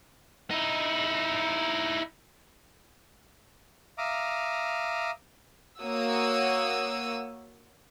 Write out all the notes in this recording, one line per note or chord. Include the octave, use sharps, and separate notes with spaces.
D#4 E4
E5 F5 A#5 D6 D#6
A#3 F#4 C#5 D#6 E6